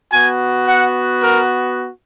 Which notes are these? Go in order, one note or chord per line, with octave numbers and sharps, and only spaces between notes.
B3 F#4 G#5
F#5
A#4